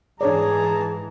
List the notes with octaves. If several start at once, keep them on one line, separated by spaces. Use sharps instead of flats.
G#2 E3 D4 G#4 C#5 D5 A5 A#5